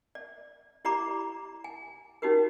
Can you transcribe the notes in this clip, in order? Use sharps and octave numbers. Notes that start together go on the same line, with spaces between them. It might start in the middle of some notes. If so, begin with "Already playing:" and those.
D5
E4 G4 D5 A#5 B5 D6
G#5
C#4 D#4 F#4 G4 A#4